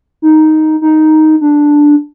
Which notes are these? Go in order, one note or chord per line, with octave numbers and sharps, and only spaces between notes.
D#4
D#4
D4